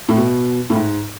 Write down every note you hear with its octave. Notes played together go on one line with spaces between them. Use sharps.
A2
B2
A2
G#2